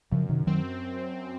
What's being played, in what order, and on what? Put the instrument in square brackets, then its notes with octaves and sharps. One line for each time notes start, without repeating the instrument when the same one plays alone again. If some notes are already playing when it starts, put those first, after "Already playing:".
[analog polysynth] F#2 [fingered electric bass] C#3 F3
[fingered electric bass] C3 D#3
[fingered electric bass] D#3 F#3 [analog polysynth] C4